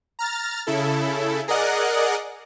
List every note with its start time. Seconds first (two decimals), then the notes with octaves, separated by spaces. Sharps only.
0.19 A#5 F6 A6
0.67 C#3 E4 A4
1.48 G#4 A#4 D5 D#5 F#5 F#6